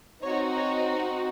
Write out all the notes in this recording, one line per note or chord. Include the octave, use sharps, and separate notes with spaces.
C4 D#4 F#4 C#5
C#5